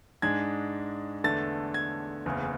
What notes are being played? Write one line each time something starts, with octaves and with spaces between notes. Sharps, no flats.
G#2 G#3 D4 G#6
E2 D3 A3 A6
G#6
F#1 E2 C#3